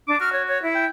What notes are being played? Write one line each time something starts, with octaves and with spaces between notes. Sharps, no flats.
D4 D6
F#4 F6
C#5
C#5
E4
G5